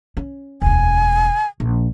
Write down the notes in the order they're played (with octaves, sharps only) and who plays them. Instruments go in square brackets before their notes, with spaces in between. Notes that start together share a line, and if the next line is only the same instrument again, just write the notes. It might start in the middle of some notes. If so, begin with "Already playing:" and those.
[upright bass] C#4
[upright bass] E1 D2 [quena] G#5
[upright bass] A#1